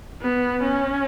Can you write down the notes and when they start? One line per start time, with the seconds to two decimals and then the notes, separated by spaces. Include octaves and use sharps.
0.21 B3
0.62 C#4